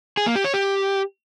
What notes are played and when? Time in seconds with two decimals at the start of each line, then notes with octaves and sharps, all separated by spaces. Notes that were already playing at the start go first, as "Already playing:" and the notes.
0.17 G#4
0.26 A#3
0.36 G4
0.45 C#5
0.54 G4